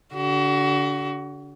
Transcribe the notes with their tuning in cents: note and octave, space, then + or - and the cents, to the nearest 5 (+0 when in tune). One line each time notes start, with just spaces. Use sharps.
D3 -30 F#4 +30